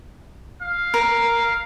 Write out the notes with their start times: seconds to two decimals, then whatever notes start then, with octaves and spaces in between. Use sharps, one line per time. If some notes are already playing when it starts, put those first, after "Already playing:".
0.61 F5
0.94 A#4